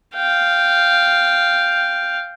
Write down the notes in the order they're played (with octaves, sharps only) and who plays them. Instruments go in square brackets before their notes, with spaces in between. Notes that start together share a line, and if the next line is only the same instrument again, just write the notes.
[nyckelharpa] F5 G5